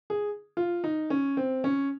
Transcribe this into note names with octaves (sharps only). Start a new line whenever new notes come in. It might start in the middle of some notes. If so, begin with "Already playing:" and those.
G#4
F4
D#4
C#4
C4
C#4